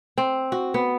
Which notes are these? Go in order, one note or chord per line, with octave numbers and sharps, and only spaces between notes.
C4
F#4
B3